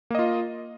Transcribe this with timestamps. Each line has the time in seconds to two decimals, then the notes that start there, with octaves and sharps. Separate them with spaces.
0.10 A#3
0.15 D#5
0.19 F4